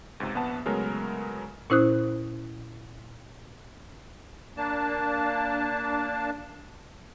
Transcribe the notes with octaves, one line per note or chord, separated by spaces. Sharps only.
C#2 G#2 C3
A#1 B3 F#5 A5
C#3 F#3 G#3 A3 B3 A#4
A#2 C#4 E4 C5 D#6 F#6
A#3 D4 A5